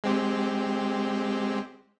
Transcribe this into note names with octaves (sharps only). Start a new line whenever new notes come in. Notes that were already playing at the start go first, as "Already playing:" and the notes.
G#3 C4 G4